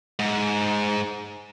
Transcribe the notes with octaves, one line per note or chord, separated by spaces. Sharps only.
G#2